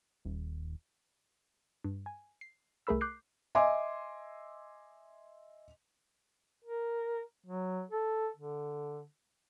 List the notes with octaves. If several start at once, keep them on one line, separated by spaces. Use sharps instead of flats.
D#1
G2
G#5
C7
C2 A3 G#4 A#4 B5 E6
D6 F#6 G6 C7
D#5 E5 G#5 C6 D6
A#4
F#3
A4
D3